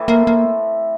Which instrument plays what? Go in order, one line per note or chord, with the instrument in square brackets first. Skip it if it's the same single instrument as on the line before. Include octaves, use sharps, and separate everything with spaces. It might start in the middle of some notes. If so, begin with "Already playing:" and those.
Already playing: [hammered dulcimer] A2 E3 A3 C4
[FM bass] A#3
A#3